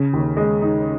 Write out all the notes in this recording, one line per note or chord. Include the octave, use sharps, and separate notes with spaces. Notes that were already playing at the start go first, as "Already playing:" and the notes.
Already playing: C#3
D#2
G#3
D#4